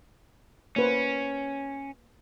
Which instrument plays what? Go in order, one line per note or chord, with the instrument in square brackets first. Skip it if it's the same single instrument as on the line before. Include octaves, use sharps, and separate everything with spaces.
[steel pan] A#3 B4 C5 [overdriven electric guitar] C#4